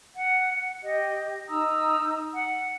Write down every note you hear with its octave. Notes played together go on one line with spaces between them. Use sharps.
F#5
G4 D#5
D#4 A#5 D#6 E6
F#5